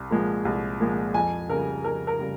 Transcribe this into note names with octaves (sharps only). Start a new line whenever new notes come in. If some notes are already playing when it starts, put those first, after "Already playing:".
Already playing: C2
A#2 F3 G#3
C2
A#2 F3 G#3
F2 G#5
C#3 G3 A#4
F2 A#4
A#4
C#3 G3